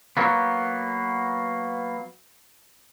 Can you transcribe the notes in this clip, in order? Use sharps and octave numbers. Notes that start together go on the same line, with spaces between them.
F#3 A#3 B3